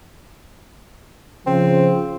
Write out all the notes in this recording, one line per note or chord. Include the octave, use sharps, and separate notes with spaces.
C#3 F3 C4